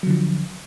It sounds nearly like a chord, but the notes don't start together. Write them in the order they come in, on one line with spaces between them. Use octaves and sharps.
F#3 D3 F3